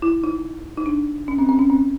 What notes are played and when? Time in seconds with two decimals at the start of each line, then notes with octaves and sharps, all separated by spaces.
0.02 E4
0.23 D#4
0.78 D#4
0.86 D4
1.28 C#4
1.39 C4
1.49 C4
1.59 C#4
1.70 C4